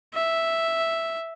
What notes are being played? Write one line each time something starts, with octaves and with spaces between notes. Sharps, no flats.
E5